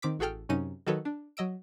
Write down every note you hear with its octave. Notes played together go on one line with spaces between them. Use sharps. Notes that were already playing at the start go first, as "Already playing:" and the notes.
D#3 C4 D6 B6
A1 F#4 G#4 A4 G5 F6
F#2 C3 C#4 D#4 D#7
D#3 F#3 F#4 A4 B4 C#5
D4
F#3 D#5 E6 D7